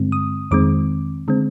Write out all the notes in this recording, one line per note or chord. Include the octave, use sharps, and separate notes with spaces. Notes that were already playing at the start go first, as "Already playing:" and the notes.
Already playing: G2 D3 G#3 C4
D#6
F2 D#3 G#3 C4 D6
D3 G#3 C4